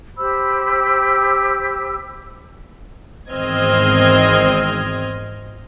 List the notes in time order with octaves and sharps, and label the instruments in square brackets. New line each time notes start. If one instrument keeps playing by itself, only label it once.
[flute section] G4 C5 B5 E6
[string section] G#1 E2 C4 D#5 F6 G#6